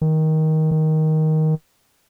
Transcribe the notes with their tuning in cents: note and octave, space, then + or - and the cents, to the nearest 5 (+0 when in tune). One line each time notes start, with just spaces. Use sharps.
D#3 +15
D#3 +10